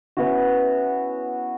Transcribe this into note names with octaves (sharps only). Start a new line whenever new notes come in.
B3 C#4 E4 F#4